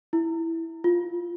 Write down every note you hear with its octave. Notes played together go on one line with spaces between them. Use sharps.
E4
F4